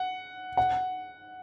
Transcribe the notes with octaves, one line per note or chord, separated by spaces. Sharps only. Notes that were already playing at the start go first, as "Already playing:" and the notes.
Already playing: F#5
F#5